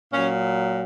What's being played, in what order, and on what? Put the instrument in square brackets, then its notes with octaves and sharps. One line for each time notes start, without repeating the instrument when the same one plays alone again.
[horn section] A#2 F#3 C#4